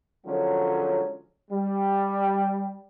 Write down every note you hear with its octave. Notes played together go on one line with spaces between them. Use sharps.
D3 F3 F#3 G#3 C#4
G3